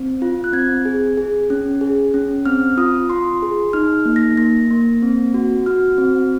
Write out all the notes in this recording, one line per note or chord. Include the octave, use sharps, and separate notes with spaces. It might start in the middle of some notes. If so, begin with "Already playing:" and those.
Already playing: C4
F4
F#6
C4 G#6
G#4
G#4
C#4
G#4
C#4
C4 F6
F4 D#6
F4 C6
G#4
D#4 F6
A#3
A#6
A#3 A#6
A#3
C4
F#4
F#4 F6
C4